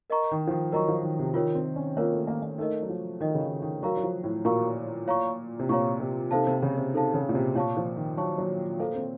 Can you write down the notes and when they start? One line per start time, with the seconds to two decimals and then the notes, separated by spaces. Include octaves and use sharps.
0.10 A#4 D#5 A#5 C#6
0.32 D#3
0.47 F3
0.51 D#3
0.72 F#3 A#4 D#5 A#5 C#6
0.88 F3
1.03 D#3
1.19 C3
1.34 D#3 F4 A#4 C#5
1.55 C4
1.76 C#4
1.97 A#3 F4 A#4 C#5
2.13 A3
2.27 A#3
2.43 A#3
2.58 A3 D#4 A#4 D#5
2.82 F#3
2.89 F3
3.20 D#3 D#4 A#4 D#5
3.35 C#3
3.41 D#3
3.62 D#3
3.83 F#3 F#4 A#4 F5 A#5 C#6
3.97 F#3
4.03 F3
4.24 A2
4.45 A#2 F#4 A#4 F5 A#5 C#6
5.08 C#5 F5 A#5 C#6
5.59 C3
5.69 A#2 C#5 F5 A#5 C#6
6.00 C3
6.31 C3 D#4 A4 C5 F5 A5
6.47 C3
6.62 C#3
6.77 C3
6.94 D#4 A4 C5 F5 A5
7.14 C#3
7.29 A#2
7.35 C3
7.55 A#2 C#5 F5 A5 C#6
7.77 F3
7.96 D#3
8.17 F#3 C#5 F5 A5 C#6
8.38 F#3
8.80 A#3 A4 C5 F5
8.95 C4